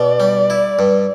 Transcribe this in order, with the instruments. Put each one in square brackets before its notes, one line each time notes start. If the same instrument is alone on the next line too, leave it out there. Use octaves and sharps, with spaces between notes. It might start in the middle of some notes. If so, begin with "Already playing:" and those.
Already playing: [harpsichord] B2 [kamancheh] D5
[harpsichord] G3
E4
G2